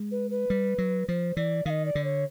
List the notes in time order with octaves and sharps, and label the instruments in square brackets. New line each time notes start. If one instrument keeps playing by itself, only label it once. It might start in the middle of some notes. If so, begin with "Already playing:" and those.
Already playing: [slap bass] G#3
[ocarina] B4
B4
[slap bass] G3
F#3
[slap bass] F3 [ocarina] C5
[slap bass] E3 [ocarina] D5
[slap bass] D#3 [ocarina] F5
[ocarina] D#5
D5
[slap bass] D3
[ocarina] C#5